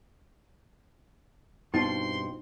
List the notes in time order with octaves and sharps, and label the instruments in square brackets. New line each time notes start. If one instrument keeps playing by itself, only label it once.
[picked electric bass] G2 [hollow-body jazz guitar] B2 C4 F4 [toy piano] D#4 [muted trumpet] C6